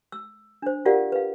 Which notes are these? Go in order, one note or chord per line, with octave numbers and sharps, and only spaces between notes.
E6
D4 C5
F4 G4 A#4 D5 F5 F#5
B4 F5